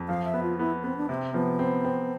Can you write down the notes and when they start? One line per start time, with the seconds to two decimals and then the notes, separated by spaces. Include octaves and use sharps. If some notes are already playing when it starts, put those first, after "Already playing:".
Already playing: F2
0.08 F3 F5
0.25 E5
0.34 B3
0.43 F4
0.58 B3 E4
0.84 B3 C4
0.97 D4
1.09 C3 C4
1.34 F3 B3
1.59 C4
1.85 C4